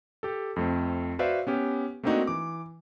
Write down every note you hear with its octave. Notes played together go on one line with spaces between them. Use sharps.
G4 A4
F2 A3 C4
F#4 B4 C5 D5 E5 F5
B3 C#4 G4
A3 A#3 C4 D4 D#4 F#4
E3 D6